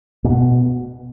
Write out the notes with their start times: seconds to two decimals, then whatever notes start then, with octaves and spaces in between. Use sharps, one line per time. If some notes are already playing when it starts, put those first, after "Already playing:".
0.24 A#2
0.30 B2